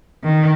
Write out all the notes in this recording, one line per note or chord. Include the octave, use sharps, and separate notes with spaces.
D#3